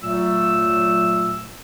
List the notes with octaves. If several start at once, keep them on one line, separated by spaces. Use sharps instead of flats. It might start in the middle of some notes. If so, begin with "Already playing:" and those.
A#2 F#3 A3 E6